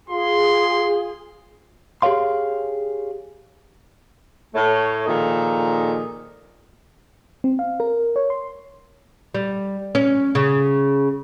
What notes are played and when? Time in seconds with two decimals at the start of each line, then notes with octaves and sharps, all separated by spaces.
0.10 F4 G#4 C6
2.02 G4 G#4 C5 C#5 F5 C6
4.54 A2 A3 C#5
5.06 A#2 D#3 F3 D#4 G#4 A4
7.44 C4
7.59 F5
7.80 A#4
8.16 C#5
8.30 C6
9.34 G3
9.95 C#4
10.35 C#3